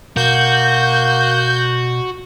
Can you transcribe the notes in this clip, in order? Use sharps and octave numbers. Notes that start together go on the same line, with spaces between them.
B2 A#3 F#4 G6